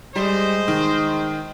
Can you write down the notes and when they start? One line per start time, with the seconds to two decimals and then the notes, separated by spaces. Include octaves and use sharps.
0.16 G3 G#3 C5 D#5
0.68 D#3